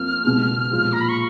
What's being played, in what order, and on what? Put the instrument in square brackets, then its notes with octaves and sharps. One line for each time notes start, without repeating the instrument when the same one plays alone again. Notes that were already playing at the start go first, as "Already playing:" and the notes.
Already playing: [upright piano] F2 F3 A#3 [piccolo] F6
[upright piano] C#2 B2 G#3
A#2 F3 G#3
[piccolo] A#5
B5
C#6